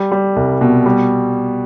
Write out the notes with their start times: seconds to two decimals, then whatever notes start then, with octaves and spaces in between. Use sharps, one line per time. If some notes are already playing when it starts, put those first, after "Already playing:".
Already playing: G3
0.12 G3
0.36 C2
0.61 B2
0.86 G3